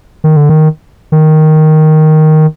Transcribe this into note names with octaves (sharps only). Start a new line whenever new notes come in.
D#3
D3
D#3
D#3